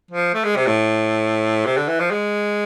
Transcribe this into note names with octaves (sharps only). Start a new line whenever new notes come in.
F3
A3
G#3
C3
A2
C3
D3
E3
F3
G#3